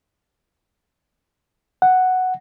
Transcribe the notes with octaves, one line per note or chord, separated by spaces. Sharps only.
F#5